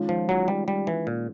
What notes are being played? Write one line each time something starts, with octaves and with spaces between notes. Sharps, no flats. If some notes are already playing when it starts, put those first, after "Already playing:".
Already playing: D#3 G#3 C#4 F4
F3
F#3
G3
G3
E3
A#2